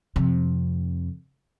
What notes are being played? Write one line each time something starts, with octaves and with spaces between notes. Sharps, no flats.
F2 C3